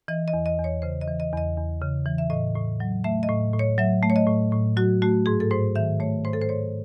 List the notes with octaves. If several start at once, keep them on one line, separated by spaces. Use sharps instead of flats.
E3 D#5
D#5
E2
D#5
E2
C#5
C#3 C5
D#5
E3
D#5
E2 D#5
E2
C#3
E3
E5
A2 D#5
A2
F#3
A3 E5
D#5
A2
A2
C#5
F#3 E5
A3
C#5
D#5
A2
A2
F#3 F#4
A3 F#4
G#2 G#4
A4
G#2 C5
D#3 E5
A3 C#5
G#2 C5
A4
C5
G#2 C#5